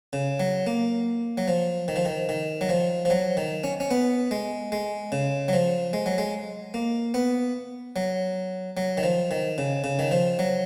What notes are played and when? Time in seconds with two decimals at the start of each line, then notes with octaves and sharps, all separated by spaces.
0.13 C#3
0.40 F#3
0.67 A#3
1.38 F#3
1.48 F3
1.88 D#3
1.96 F3
2.05 D#3
2.29 D#3
2.61 F#3
2.69 F3
3.05 F3
3.10 F#3
3.37 D#3
3.64 C#4
3.80 C#4
3.91 B3
4.31 G#3
4.72 G#3
5.12 C#3
5.48 F#3
5.53 F3
5.93 G#3
6.06 F#3
6.18 G#3
6.74 A#3
7.14 B3
7.96 F#3
8.77 F#3
8.98 D#3
9.03 F3
9.31 D#3
9.58 C#3
9.84 C#3
9.99 D#3
10.11 F3
10.39 F#3